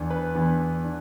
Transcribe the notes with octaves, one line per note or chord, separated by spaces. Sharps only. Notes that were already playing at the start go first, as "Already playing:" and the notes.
Already playing: E2 E3 B3 D4
B4
E2 E3 B3 D4
D4